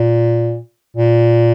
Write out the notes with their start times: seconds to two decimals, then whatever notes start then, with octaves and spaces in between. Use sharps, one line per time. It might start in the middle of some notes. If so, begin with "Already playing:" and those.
Already playing: A#2
0.96 A#2